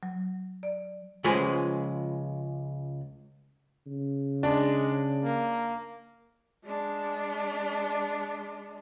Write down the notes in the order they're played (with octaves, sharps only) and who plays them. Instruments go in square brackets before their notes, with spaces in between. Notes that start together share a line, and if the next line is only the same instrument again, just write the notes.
[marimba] F#3
D5
[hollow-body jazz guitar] C#2 F3 G#3 B4 C5 G#5
[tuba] C#3
[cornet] G#3 [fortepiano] D4
[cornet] A#3
[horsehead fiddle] G#3 D4